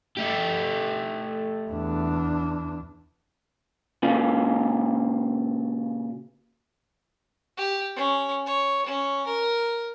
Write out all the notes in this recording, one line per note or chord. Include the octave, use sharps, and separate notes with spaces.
A3 G4
E2 D4
A#2 C#3 F4
G4
C#4
C#5
C#4
A#4